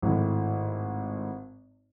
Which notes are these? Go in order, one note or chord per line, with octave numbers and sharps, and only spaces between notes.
G#1 A2